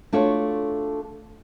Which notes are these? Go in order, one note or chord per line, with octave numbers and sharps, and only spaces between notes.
A3 D4 F4 F#4 A4 C#5